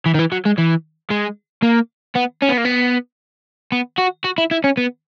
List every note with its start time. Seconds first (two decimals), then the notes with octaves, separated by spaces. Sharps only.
0.06 E3
0.14 D#3
0.19 E3
0.32 F#3
0.45 G#3
0.58 E3
1.11 G#3
1.63 A#3
2.15 B3
2.42 C#4
2.49 B3
2.57 A#3
2.65 B3
3.72 B3
3.98 F#4
4.24 F#4
4.38 E4
4.51 E4
4.64 C#4
4.77 B3